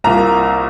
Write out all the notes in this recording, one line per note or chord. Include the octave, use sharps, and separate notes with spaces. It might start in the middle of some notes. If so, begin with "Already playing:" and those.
C2 A#2 A#3 A#5